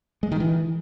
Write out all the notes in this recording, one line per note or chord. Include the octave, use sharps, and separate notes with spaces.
G#3
D#3
E3